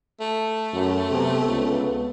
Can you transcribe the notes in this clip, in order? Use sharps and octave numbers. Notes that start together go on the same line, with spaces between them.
A3
F#2
C3 B3
C#2